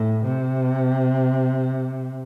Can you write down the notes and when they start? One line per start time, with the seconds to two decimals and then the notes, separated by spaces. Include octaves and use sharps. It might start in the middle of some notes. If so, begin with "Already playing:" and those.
Already playing: A2
0.25 C3